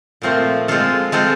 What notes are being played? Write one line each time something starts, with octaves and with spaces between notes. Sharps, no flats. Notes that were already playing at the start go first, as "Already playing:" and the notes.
A#2 F3 A3 C4 F4
G#3 C4 F4 A4
G#3 C4 F4 A4